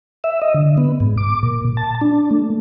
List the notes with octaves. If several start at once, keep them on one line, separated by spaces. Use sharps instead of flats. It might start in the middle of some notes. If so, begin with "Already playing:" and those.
E5
D#5
D3
B3
G#2
D6
A#2
A5
D4
A3